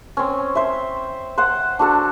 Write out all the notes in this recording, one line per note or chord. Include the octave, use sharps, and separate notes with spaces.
C4 C#4
C5 E5
C5 F#5
D4 F#4 A4